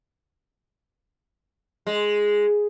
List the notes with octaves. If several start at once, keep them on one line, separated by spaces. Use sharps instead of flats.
G#3